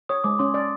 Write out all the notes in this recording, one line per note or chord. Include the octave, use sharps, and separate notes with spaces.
C#5 D#6
G#3 D6
C#4 C6
D5